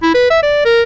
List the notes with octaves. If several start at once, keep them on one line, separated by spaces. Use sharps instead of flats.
E4
B4
E5
D5
A#4